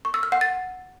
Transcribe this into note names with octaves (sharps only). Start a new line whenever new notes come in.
C#6
E6
F6
F#5
A6